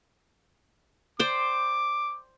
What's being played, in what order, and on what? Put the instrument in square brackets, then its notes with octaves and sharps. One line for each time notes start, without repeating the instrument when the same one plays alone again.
[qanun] C5 D5 G5 [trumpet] D6